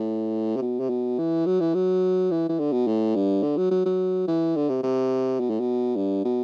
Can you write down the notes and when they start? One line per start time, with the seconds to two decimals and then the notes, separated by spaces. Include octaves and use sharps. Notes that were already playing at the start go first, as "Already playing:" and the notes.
Already playing: A2
0.57 C3
0.62 B2
0.80 C3
0.89 B2
1.19 E3
1.46 F#3
1.60 E3
1.75 F#3
2.31 E3
2.49 E3
2.59 D3
2.73 B2
2.87 A2
3.15 G2
3.43 D3
3.57 F#3
3.71 F#3
3.86 F#3
4.28 E3
4.56 D3
4.69 C3
4.83 C3
5.40 B2
5.50 A2
5.60 B2
5.96 G2
6.25 B2